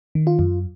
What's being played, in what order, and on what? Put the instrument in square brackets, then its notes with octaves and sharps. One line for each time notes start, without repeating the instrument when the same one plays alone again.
[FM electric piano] D#3
F4
F#2